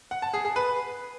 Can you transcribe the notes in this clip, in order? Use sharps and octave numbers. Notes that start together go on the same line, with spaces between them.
F#5
A5
G#4
G#4
B4